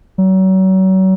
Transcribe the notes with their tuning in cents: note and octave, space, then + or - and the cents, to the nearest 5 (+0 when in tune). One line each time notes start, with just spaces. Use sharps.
F#3 +35